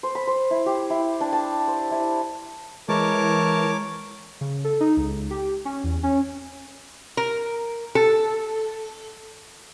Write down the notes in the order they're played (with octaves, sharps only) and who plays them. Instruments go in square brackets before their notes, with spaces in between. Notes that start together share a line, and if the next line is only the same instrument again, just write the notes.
[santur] C5
B5
C5
E4
G4
E4
D4
A5
C5
E4
[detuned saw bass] E3 [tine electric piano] G#3 [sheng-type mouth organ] A#4 A5 [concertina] C#5 D6
[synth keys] C#3
A4
D#4
C#2
G4
C#4
E2
C#4
[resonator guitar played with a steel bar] A#4
A4